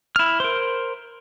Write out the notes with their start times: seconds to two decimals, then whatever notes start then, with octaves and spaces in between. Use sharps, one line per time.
0.16 E4 F6
0.40 A#4 C5